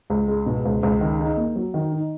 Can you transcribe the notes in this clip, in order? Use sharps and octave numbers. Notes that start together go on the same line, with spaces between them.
C#2
G#3
B2
C#2
C#2
D#3
D#4
A#3
F#3
D#3
D#4